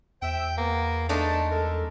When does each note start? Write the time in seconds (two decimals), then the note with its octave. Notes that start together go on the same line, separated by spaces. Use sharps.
0.22 E2 C5 E5 G5
0.58 A#3 B3
1.09 G#3 A3 D4 D#4 A5
1.51 A4 A#4